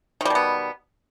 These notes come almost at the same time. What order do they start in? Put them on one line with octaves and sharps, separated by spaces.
D#3 G3 B2 B3